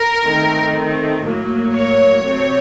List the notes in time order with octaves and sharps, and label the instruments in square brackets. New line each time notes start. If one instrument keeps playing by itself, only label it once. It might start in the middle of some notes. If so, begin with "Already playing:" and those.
Already playing: [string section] A#4
D#3 A3 C4
A2 F#3 A#3
C#5
C3 F#3 A3 C4